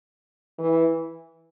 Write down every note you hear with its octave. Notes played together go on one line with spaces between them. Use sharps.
E3